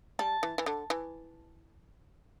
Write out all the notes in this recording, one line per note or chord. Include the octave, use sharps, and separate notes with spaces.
G3 A5
E3
E3
D3
E3